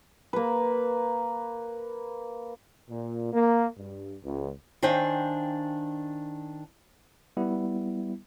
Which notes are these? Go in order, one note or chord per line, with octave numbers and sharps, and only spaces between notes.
A#3 B4
A#2
A#3
G2
C#2
D#3 D4 C5 F5 G5 G#5
G3 B3 E4